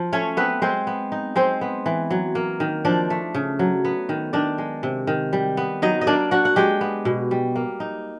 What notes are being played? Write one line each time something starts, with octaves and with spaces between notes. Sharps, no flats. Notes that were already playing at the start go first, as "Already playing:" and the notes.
Already playing: F3
A3 C#4 C#5
B3 C4 B4
G#3 C4 C5
B3
D#4
G#3 C4 C5
B3
E3
F#3
A#3
D#3
F3 D4 D5
A3
C#3
F#3
B3
D#3
D#3 D4 D5
G#3
C3
D#3
G3
B3
F#3 D#4 D#5
D#5
A#3 D4 D5
D4 F#4 F#5
F#5
G#3 G4 G5
B3
B2
G3
A#3
D#4